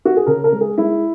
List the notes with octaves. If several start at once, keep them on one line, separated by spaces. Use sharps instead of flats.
F#4
G#4
C#3 A#4
A#4
G#3
G#4
G#3 E4